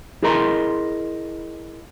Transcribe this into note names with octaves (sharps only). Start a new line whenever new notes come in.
E4 G#4 A#4 D#5 A#5 C6